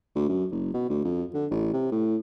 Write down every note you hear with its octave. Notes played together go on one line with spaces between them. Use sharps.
D2
F#2
F#1
B2
D2
F2
D3
A1
C3
A2